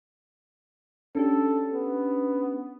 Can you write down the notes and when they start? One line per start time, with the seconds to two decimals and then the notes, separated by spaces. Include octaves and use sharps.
1.15 C#4 D4 G4 A4
1.73 B3